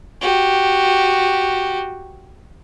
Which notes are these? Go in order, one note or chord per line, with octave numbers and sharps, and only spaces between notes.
F#4 G4